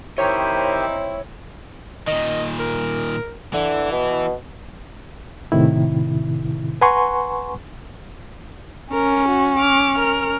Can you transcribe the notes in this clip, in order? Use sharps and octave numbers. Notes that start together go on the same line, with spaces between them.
D#3 C4 E4 G4 C5 C#5 D#5 A#5
A#2 D#3 D#5
A#4
D3 E3 E4
B2
A2 C3 D#3 E4
B4 F#5 G#5 A#5 C6 C#6
C#4 A#4
F#4
D6 F6
A#4 F6